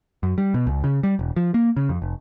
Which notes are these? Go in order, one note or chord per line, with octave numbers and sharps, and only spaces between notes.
F#2
G3
B2
C#2
C#3
G3
E1
F3
A#3
C#3
F2
F1